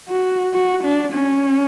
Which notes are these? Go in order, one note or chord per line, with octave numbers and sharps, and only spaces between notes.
F#4
F#4
D4
C#4